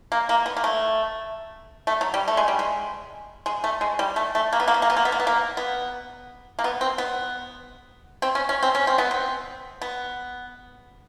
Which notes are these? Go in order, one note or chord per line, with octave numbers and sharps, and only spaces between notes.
A#3
A#3
B3
A#3
A3
A3
F#3
G3
A3
G#3
G3
G#3
G#3
A3
G#3
G3
A3
A3
A#3
B3
A#3
B3
A#3
B3
A#3
B3
A#3
B3
A#3
B3
A#3
B3
C4
B3
C4
C#4
C#4
C4
C#4
C4
B3
C4
B3